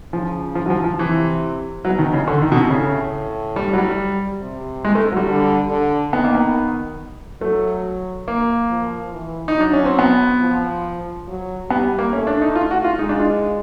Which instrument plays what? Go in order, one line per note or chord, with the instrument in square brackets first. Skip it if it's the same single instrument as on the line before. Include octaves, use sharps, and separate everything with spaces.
[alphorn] C#3 [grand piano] F3
[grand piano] F3
F#3
F3
F3
[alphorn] C3 [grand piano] E3
[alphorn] B2 [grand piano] F#3
[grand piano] D#3
C#3
D3
D#3
B2
C3
[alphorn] A2 [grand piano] C#3
[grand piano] G3
F#3
G3
[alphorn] C3
[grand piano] G#3
A3
F#3
G3
[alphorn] D3
D3
[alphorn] D#3 [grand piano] B3
[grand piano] A#3
B3
[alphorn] F#3 [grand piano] A3
[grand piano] A#3
[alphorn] F3
E3
[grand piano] D#4
[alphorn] F#3 [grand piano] D4
[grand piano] C#4
C4
B3
[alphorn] F3
F#3
[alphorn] G3 [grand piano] B3
[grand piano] A#3
[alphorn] A3 [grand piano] C#4
[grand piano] D4
D#4
F4
F#4
F4
[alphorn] G#3 [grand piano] D#4
[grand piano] D4
F4